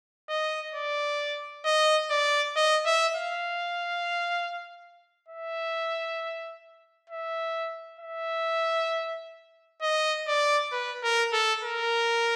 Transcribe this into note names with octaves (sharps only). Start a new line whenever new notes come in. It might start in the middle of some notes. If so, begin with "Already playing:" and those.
D#5
D5
D#5
D5
D#5
E5
F5
E5
E5
E5
D#5
D5
B4
A#4
A4
A#4